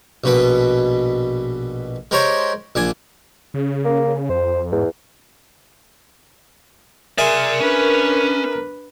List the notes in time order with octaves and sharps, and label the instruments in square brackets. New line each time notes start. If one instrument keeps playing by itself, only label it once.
[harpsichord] A#1 B2 B4
G#3 G4 A#4 C5 C#5
A#1 D4 G#5
[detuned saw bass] C#3
[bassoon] A#3
[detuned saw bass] F2 [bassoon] C5
[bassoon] E2 [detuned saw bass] G#2
[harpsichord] G#4 E5 G#5 [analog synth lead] A#4 [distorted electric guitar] D5 C6
[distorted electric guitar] C#4 [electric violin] D4 B4